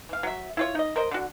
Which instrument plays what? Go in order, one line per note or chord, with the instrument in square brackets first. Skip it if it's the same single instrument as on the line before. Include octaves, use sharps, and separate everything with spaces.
[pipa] E3 F5
F#3 E5
E4 F4 C#5
D#4 D#5
A#4 C5 D#5
D3 F#4